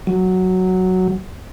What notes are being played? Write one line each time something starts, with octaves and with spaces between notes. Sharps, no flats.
F#3